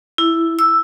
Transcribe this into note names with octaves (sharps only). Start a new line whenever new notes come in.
E4
E6